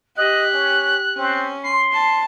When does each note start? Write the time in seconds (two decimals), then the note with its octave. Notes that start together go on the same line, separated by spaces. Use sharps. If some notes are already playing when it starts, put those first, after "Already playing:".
0.17 G4 D#5 F#6
0.54 C#4
1.17 C4 C#4
1.64 C6 C7
1.92 A5 C7